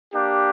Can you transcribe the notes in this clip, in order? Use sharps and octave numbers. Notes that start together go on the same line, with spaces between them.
A#3 D4 G4